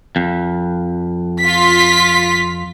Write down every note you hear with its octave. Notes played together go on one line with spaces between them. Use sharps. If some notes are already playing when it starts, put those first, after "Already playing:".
F2
F4 B6